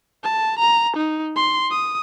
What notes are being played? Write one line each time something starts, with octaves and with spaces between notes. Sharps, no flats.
A5
A#5
D#4
C6
D#6